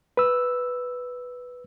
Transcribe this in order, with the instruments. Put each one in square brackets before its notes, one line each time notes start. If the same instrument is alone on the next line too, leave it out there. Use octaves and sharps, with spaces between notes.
[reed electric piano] B4 E6